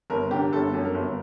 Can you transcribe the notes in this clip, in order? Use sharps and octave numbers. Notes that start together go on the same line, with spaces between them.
G1 A#4
D3 G4
G1 A4
F#2
A#4
G1